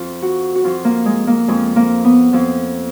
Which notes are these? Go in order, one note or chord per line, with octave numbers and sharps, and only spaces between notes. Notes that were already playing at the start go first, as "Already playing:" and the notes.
Already playing: F2 F3 F4
F#4
F#4
F2 F3 F4
A#3
G#3
A#3
F2 F3 G#3
A#3
B3
F2 F3